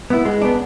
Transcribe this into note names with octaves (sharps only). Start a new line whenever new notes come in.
B3 E4
G#3
B3 D4